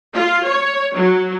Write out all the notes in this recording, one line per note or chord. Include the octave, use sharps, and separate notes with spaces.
F4
C#5
F#3